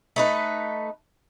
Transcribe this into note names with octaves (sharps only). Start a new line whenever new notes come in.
A3 D#4 B4